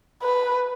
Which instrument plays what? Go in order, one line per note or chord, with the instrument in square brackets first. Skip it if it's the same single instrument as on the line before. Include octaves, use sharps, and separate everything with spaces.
[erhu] B4